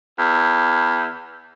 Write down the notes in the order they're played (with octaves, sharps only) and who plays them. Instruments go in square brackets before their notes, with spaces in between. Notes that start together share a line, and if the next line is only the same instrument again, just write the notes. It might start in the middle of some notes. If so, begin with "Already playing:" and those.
[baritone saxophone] E2